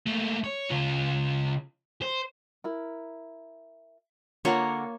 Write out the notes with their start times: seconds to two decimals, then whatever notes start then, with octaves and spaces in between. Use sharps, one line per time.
0.06 A3 A#3
0.44 C#5
0.70 C#3 F4
2.02 C5
2.64 E4 A#4
4.45 D3 A#3 F4 A#4 C#5 F#5